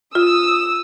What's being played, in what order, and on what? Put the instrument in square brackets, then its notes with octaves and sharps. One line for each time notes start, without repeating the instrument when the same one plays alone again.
[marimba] F4 [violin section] D#6 E6